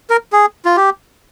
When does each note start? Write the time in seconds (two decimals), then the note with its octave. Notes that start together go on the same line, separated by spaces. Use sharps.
0.10 A#4
0.33 G#4
0.65 F4
0.77 G4